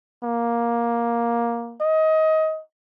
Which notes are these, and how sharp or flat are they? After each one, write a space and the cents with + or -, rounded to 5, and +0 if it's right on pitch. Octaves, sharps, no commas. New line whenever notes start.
A#3 +10
D#5 +25